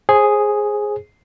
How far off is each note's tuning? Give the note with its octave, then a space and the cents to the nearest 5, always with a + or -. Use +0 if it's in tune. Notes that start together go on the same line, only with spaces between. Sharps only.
G#4 +0 C5 +30